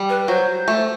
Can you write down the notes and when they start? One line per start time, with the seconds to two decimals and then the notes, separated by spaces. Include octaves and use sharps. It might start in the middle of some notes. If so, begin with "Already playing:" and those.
Already playing: G3
0.09 B4
0.28 F#3 C5
0.68 A3